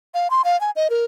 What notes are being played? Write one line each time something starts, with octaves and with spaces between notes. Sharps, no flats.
F5
C6
F5
G#5
D#5
A#4